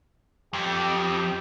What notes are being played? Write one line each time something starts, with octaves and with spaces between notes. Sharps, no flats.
F2 G4